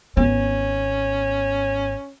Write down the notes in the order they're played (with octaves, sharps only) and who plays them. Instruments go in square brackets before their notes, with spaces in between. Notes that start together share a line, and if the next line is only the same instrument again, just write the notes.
[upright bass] G#1 B3 [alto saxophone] C#4